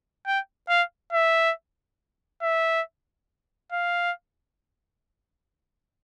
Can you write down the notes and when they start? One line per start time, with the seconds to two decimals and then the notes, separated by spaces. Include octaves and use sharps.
0.26 G5
0.69 F5
1.13 E5
2.43 E5
3.72 F5